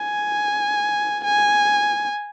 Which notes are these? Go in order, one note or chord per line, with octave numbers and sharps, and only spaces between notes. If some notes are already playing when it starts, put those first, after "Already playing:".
Already playing: G#5
G#5